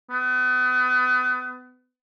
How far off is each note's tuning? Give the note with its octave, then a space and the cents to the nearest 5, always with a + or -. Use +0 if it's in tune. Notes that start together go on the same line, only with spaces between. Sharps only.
B3 +35